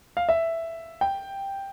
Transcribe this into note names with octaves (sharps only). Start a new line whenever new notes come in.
F5
E5
G5